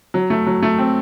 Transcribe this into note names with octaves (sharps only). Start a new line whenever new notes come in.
F#3
A3
F#3
A3
C4